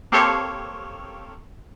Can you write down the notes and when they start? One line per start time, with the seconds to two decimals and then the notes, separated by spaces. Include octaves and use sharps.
0.12 A#3 C4 G4 A4 C#5 F5